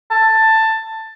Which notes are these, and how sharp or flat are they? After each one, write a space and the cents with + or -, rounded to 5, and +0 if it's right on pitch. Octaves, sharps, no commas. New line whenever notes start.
A5 +10